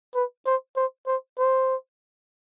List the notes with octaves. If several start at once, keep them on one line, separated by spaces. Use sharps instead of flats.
B4
C5
C5
C5
C5